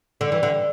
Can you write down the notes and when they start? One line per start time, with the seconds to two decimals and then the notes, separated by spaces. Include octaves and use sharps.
0.21 D3
0.32 E3
0.43 D3